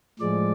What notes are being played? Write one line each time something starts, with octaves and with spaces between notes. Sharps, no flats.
A2 F3 G#3 D5